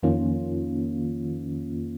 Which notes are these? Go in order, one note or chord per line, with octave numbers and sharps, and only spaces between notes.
F2 D#3 A#3 C#4 F4